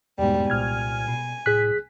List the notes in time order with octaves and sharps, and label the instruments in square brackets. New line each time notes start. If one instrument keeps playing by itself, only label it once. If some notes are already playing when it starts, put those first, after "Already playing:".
[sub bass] E2 [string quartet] G#2 B2 G3
[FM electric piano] C2 F6 G#6 [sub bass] A#2 [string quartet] G#5
[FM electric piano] B2
[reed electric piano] C2 G#4 F#6 [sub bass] A2 [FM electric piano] B6